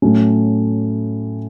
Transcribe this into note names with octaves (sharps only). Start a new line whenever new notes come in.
A2 F#3 A3 C#4